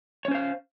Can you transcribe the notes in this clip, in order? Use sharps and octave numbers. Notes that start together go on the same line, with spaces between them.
C#4 C5 C#5 F5